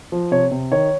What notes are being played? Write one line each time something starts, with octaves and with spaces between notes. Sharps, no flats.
F3
C3 C#5
C3
D#3 C#5